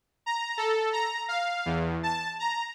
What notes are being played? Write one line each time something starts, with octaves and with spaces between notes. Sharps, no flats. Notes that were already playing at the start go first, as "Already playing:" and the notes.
A#5
A4
A#5
F5
E2
A5
A#5